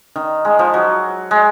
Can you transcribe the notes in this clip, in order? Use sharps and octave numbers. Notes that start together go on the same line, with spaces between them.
D#3
G#3
F3
F#3
G#3